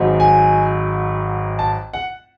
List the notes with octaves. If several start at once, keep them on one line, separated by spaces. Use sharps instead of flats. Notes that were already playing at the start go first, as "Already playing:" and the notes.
Already playing: G#1 G#2 F#3
G#5
A5
F#5